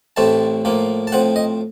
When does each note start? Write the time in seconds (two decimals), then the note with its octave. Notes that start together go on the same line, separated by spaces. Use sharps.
0.16 A1 A2 A3 C4 A5
0.65 A2 F3 A#3
1.07 A5
1.12 A2 F3 C4 F#5
1.36 D#5